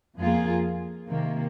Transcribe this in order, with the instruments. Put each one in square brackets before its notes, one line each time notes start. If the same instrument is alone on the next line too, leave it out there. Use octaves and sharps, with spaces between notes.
[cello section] F2 F3 A#3 F4 G#4
C3 D#3 A#3